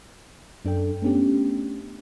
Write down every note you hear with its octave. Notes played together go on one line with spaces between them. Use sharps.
F#2 D4 A4 G5
A3 B3 C#4 D4 G4